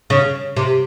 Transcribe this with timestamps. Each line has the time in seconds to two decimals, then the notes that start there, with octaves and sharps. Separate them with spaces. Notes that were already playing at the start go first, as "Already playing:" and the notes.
0.10 C#3
0.57 C3